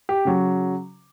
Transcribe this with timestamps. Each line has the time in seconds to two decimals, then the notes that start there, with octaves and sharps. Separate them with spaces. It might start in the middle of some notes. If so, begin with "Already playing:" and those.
0.09 G4
0.25 C#3 F#3